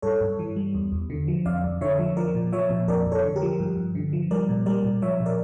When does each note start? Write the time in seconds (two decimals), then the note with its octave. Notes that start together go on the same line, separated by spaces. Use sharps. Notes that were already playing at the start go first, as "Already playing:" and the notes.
0.02 G2 A4 C#5
0.21 G2
0.39 E3
0.56 G3
0.75 E2
0.92 E2
1.10 D3
1.28 F3
1.46 F2 D5 F5
1.64 F2
1.81 D3 C#5 E5
1.99 F3
2.16 F3 A#4 D5
2.35 A#2
2.52 F3 C#5 E5
2.70 A#2
2.88 F2 A#4 D5
3.06 F2
3.12 A4 C#5
3.24 D3
3.36 G4 A#4
3.42 F3
3.60 G2
3.77 G2
3.95 D3
4.13 F3
4.31 G3 A#4 D5
4.49 A#2
4.66 G3 A#4 D5
4.84 A#2
5.02 F3 C#5 E5
5.20 A#2
5.26 A#4 D5